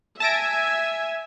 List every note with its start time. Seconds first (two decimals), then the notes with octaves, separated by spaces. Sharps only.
0.20 E5 G#5 A5 A#6 D7